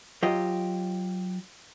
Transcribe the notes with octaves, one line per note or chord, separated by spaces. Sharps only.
F#3 F4 G4 D#5